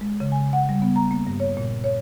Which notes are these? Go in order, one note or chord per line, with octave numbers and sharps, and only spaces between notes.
G#3
C#3
G#5
F#5
G3
B3
A#5
A#3
G2
C#5
A#2
C#5